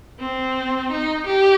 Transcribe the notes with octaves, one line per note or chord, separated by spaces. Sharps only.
C4
D#4
G4